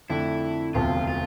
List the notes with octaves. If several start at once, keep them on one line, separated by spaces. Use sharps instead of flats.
F2 D3 A3 D4 E4
E1 D2 C3 F3 A3 F4
F4